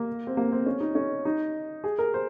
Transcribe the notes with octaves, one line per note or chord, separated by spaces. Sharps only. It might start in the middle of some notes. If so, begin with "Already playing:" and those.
Already playing: A#3
C4
A#3
C4
C#4
D#4
C#4
D#4
G#4
A#4
C5